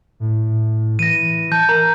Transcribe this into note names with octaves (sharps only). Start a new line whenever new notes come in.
A2
E3 A#6 D#7
A5 G6
A#4 A#5